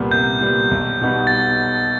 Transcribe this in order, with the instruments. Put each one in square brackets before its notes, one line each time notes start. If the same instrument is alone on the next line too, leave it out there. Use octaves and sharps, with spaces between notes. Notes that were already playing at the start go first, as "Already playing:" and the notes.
Already playing: [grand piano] C2 A#2 G3 B3
[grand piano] C2 [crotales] G6
[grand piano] A#2 G3 B3
B1
B2 G3 B3 D#4
[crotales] A6